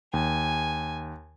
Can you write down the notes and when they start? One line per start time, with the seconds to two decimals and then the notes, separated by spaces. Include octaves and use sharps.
0.14 D#2 G#5